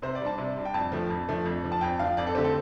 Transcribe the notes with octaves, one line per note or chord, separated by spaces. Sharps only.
C3 C5
D5
G3 D4 A5
C3
G3 D4
G5
F2 A5
F3 A3 D4
F2
F3 A3 D4
F2
F3 D4
A5
F2 G5
F3 D4 F5
F2 D5
A4
D3 A3 C4 G4
A4